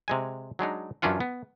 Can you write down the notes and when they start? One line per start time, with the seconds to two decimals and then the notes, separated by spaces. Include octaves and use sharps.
0.08 C3 G#3 G#5
0.59 F#3 G#3 D4 D#4
1.02 F#2 E3 C#4 D4 F4 F#5
1.20 B3